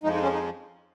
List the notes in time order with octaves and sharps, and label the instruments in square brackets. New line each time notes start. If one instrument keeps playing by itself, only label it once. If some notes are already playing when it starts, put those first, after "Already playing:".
[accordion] F2 F3 G#3 D#4
D#4
C#4
D#4